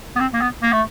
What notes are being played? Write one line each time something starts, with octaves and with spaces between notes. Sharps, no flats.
B3
C4
A#3
B3
A#3
A3